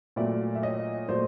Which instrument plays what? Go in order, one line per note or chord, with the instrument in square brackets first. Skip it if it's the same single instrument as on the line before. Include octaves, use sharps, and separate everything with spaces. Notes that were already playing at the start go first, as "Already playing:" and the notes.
[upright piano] A#2 F#3 A3 D5 E5
E5
C#5 D#5
A#2 F#3 A3 C5 D5